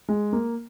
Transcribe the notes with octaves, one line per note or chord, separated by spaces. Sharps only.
G#3
A#3